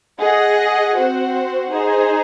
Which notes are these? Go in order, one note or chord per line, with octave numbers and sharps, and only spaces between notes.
G#4 D#5 F#5
C4 F#4 C5 F#5
D#4 G#4 C5